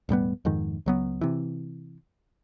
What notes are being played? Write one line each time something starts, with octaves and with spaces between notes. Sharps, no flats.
E1 A2 G3 B3
F2 G#2 D#3
C#2 F#3 B3
C3 E3